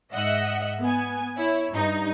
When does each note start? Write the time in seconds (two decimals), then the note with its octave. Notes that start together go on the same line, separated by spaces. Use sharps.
0.13 G#2 D#5 E5 F#5
0.82 B3 G#5
1.36 E4 C#5
1.73 G2 D#4